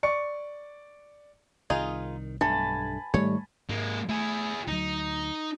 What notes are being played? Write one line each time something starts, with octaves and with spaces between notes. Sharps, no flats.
D5 C#6 C#7
C2 D#3 D#4 F4 G#4
B1 G2 A3 D4 G#5 A5 B5
G#2 D#3 G3 A3 C#5
G#2 G#3 A#3
A3 E4 G#4
D2 F#3 D#4